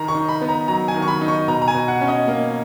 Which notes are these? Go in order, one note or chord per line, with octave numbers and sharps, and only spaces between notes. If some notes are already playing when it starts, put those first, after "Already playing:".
Already playing: D#3 A#5
C#6
D#4
B5
B3
A#5
F#3 A#5
G#5
D#3
C#6
B5
D#4
C#6
B2 A#5
A#5
G#5
B2
F#5
C#4
D#5
A#3